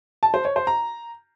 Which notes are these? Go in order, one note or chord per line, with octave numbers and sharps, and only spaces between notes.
A5
C5
C#5
C5
A#5